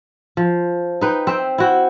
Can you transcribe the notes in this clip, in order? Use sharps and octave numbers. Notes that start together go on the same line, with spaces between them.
F3
D#4 B4 G5
C4 E5 G5
E4 F#4 G5